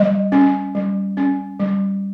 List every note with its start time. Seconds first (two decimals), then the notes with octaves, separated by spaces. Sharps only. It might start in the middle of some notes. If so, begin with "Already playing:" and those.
Already playing: G3 D#5
0.32 C#4
0.75 G3
1.17 C#4
1.59 G3